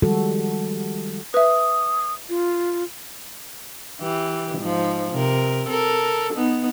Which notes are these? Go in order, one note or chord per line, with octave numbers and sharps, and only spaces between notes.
D#3 F3 G3 G#3 F#4 A4
B4 E5 D#6
F4
E3 G4
G#2 F3
C3 A#4
A4 A#4
B3 D#4